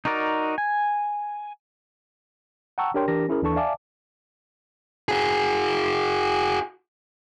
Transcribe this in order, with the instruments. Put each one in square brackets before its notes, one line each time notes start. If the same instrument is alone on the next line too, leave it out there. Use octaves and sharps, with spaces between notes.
[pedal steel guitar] D#4 F#4 A#4 D5
G#5
[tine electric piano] F#5 G5 A5 A#5 C#6 E6
D4 G4 A#4 C#5 G5 C6
E3 D4 G4 A#4 A#6
C#4 E4 G#4 A#4
D#2 E3 D4 A4 A5 C#6
D5 E5 F5 G#5 A5 D6
[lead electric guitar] F#4 G#4